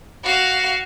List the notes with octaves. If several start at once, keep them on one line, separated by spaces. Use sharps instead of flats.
F#4 F5